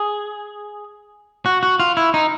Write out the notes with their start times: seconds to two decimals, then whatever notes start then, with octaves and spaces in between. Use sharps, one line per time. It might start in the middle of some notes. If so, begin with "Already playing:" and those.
Already playing: G#4
1.46 F#4
1.63 F#4
1.80 F4
1.97 E4
2.14 D#4